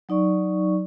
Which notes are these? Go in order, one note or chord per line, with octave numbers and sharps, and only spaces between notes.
F#3 D#4 D5 C#6